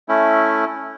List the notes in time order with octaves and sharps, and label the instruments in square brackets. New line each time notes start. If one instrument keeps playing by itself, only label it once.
[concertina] A3 C#4 E4